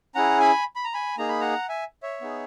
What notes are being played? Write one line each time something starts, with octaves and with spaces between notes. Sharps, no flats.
C#4 E4 G#4 F#5 A#5
G#5 B5
B5
A#5
G#5 B5
A#3 D#4 G#4 A#5
B5
F#5 A#5
E5 G#5
C#5 E5
B3 D#4 G#4